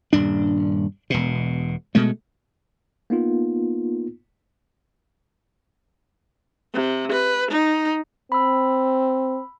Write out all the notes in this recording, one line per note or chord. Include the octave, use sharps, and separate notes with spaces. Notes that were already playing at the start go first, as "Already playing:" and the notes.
D#1 G2 D4
E1 B2
B2 G#3 A3
A#3 B3 D#4 F4
C3
B4
D#4
C4 B5 E6